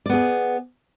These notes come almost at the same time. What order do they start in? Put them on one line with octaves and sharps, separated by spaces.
D5 B3 G#4